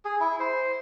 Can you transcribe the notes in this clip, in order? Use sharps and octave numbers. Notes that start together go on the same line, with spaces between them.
G#4
E4
C5